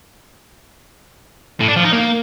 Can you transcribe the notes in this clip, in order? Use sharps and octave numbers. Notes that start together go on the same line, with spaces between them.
A2
D4
F3
D#4
A#3